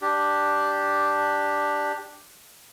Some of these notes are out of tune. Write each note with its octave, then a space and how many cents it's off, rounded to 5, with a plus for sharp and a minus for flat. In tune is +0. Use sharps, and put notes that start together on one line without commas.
D4 +0 G4 +0